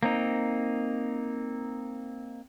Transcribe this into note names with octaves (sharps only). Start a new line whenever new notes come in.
A#3 C4 D#4